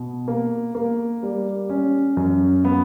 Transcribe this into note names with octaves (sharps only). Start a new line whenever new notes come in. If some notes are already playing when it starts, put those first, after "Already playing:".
Already playing: B2
A#3
A#3
G3
C#4
F#2
B3